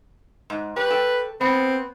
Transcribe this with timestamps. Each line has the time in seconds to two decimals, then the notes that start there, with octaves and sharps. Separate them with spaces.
0.50 G#2
0.76 G4 B4 C#5
0.90 A4 G5
1.41 B3 C4